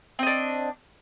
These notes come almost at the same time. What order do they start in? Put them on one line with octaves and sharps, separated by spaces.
C4 D#5 D4